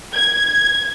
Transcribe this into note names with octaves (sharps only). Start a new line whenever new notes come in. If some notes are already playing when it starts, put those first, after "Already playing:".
G#6